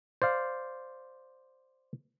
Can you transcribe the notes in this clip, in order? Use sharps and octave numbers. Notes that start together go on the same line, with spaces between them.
C5 D5 F5